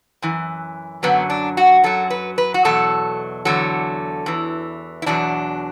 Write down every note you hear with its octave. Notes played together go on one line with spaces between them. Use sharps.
F#2 E3
F#2 D3 F#3 B3
D4
F#4
F#2 F#3 A4
B4
B4
F#4
E2 B2 F#3 A4
E2 D3 F#3 A4
E2 E3
E4
E2 B2 F#3 D4